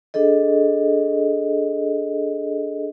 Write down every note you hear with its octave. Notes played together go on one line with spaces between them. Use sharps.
D4 G#4 A4 D#5